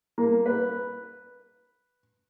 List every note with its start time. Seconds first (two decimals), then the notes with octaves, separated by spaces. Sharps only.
0.18 A#3
0.46 B4